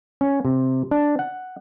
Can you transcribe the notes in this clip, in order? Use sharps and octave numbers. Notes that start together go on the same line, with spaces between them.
C#4
C3
D4
F#5